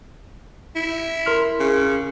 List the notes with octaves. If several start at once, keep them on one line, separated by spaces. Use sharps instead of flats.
E4
A#4 C6 F6
C#3